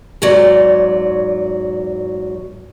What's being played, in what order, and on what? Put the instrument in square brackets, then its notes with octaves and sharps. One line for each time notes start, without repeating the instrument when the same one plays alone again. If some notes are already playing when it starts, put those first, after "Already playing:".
[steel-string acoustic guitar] E2 G#2 F#3 D5